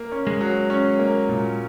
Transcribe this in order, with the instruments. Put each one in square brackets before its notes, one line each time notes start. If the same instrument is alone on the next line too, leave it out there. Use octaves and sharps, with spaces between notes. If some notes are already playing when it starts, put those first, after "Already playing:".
Already playing: [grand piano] A#3
C#4
[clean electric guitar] G#3
[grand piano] F#3
C#4
A#3
A#2